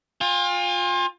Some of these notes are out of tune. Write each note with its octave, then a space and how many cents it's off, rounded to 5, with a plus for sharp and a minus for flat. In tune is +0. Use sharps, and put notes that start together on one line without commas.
F4 +25 G#5 -45